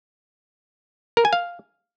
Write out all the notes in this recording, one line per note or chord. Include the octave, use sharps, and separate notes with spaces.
A#4
G#5
F5